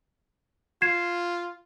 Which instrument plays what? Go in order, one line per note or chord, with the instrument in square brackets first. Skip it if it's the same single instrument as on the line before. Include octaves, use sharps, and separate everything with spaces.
[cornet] F4 [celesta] G#6 C7 E7